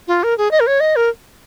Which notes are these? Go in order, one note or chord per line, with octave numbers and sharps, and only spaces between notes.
F4
A#4
G#4
D#5
A#4
C#5
D#5
A#4